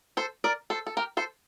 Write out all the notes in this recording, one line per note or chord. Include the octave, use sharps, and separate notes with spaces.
A4 C5
A#4 D5
A4 C5
A4
G4 A#4
A4 C5